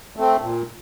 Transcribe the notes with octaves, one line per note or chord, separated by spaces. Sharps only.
A3 C4
A#2